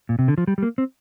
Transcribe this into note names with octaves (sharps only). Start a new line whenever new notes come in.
A#2
C3
D3
F3
G3
G3
A#3
C4